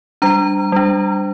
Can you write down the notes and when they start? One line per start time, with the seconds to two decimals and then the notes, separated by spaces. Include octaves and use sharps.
0.22 G3 D4 A#5
0.72 G3 D4